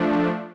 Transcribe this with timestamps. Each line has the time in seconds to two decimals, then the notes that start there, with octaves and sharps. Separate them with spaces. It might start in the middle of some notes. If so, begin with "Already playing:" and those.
Already playing: F3 A3 D4